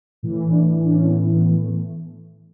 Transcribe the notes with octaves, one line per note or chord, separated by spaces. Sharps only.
A2 E3
D4
D4
C#4
B3
B3
A3